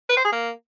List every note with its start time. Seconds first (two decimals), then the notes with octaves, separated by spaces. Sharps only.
0.09 B4
0.17 C5
0.25 G#4
0.32 A#3